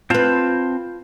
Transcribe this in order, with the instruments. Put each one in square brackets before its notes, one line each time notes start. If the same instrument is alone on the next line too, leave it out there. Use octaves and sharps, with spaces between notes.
[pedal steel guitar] C4 C5 A5 [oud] F4 B4